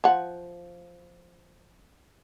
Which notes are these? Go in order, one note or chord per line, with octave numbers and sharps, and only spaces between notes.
F3 F#5